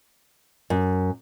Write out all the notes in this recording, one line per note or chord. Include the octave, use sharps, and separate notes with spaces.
F#2